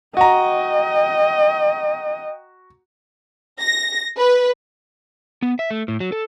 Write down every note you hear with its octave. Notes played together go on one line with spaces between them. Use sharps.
F#4 D#5 G5 A#5
A#6
B4
B3
E5
A3
A2
F#3
A4